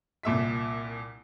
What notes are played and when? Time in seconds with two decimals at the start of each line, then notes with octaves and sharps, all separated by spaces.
0.23 C2 A#2 E5 B6